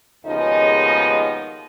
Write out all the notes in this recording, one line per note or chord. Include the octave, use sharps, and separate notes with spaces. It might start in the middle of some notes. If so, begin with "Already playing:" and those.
D#2 C#3 F3 G#3 B3 D#4 D#5